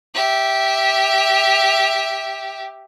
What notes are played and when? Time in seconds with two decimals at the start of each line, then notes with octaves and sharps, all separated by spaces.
0.15 G4 E5